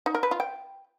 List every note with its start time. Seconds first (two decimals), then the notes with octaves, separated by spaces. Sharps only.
0.06 D#4
0.15 A#4
0.23 B4
0.31 F4
0.40 G5